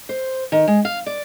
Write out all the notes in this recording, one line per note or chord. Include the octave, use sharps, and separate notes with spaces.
C5
D#3
G#3
F5
D5